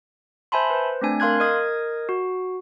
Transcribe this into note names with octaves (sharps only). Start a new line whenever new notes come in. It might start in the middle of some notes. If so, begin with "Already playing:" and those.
C5 E5 G#5 A5 B5 C6
B4 C5
A3 C4 D4 G#5
A#4 F5 C6 F#6 G#6
A#4 D#5 D#6 G#6
F#4